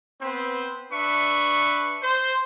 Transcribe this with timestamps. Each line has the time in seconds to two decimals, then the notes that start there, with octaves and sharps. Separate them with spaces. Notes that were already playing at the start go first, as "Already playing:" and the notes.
0.21 B3 C4 B4 C5
0.92 D4 B4 E5 C#6
2.03 C5